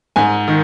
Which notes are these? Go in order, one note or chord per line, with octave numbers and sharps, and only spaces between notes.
G#2 G#5
D#3